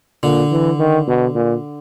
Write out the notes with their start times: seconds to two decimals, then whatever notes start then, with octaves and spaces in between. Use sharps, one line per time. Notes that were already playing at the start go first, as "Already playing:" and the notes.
0.23 A#2 D3
0.51 E3
0.79 D#3
1.08 B2
1.35 A#2